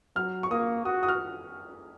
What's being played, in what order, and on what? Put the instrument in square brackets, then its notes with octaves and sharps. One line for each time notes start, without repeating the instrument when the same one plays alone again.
[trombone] F#3 [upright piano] F6
[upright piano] C#6
[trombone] A#3 [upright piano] D#6
[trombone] F#4 [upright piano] D#6
[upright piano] D#6
F6